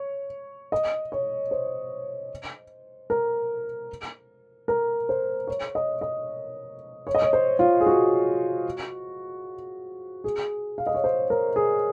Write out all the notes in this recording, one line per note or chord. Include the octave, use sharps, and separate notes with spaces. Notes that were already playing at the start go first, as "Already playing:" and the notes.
Already playing: C#5
D#5
C#5
C5
A#4
A#4
C5
C#5
D#5
D#5
C#5
D#5
C#5
C5
F4
G#4
F#4
G#4
F5
D#5
C#5
C5
A#4
G#4